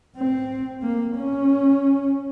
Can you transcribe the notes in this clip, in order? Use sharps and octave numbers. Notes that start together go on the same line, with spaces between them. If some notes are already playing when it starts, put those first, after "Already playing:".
C4
A#3
C#4